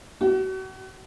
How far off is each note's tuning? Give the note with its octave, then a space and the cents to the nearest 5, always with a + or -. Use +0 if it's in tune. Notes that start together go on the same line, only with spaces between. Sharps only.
F#4 +40